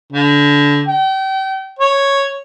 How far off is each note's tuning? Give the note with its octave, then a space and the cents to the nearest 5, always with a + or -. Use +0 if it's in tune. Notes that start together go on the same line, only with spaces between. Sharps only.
D3 -25
G5 -35
C#5 -5